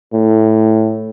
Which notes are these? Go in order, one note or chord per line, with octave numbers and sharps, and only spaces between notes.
A2